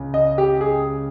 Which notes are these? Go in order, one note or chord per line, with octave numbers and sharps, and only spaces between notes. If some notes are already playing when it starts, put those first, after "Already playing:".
Already playing: C#2 C#3
D#5
G4
G#4